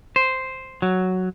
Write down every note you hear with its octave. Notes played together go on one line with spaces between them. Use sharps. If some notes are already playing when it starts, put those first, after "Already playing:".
C5
F#3